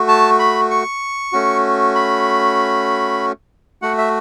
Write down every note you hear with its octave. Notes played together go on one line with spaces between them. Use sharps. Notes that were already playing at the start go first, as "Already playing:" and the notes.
Already playing: A3 F#4
A5
B5
C#6
A3 C#4 F#4
B5
A3 F#4 F#5
E5